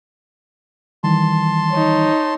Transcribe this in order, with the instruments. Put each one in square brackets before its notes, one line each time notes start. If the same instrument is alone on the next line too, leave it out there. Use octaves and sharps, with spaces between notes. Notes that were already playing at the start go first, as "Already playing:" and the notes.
[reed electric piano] D#3 E3 G3 [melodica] A5 C6
[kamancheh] D#4 C#5